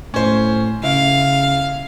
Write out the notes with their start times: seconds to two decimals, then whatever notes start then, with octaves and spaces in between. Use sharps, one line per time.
0.14 A2 C#4 C5
0.83 C#3 E4 F5